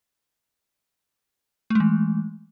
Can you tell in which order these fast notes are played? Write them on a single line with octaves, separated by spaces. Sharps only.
A3 G#3 E3